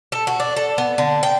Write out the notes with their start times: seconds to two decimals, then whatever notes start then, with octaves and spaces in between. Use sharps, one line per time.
0.12 A4
0.27 F#4
0.40 D4
0.57 A4
0.78 B3
0.98 D3
1.23 G5